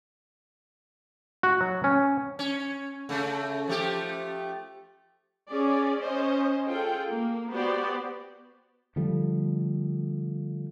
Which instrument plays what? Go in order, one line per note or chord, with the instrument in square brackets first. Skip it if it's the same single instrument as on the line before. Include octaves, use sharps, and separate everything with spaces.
[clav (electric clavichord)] F#4
F#3
C#4
[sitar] C#4
C#3 A3
F3 A3 G4
[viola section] C#4 G#4 D5
C#4 C5 D#5
F4 G#4 A4 G5
A#3
B3 F#4 G4 C5 D5
[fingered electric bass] D3 F3 G3 A3